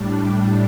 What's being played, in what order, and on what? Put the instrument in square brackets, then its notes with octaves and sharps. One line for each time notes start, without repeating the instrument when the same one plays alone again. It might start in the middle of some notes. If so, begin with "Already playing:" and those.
Already playing: [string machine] A2 G3 D4